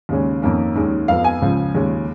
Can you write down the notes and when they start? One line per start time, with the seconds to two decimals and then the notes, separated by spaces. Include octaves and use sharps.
0.09 D#2 C#3 G#3 C#4
0.42 F2 D#3 A#3 C#4
0.76 D#2 D#3 G#3 C#4
1.08 F2 F3 B3 F5
1.24 G#5
1.42 C#2 C#3 F3 G#3
1.75 D#2 C#3 G#3 C#4